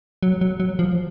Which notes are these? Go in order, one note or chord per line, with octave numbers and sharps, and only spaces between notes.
F#3
F#3
F#3
F3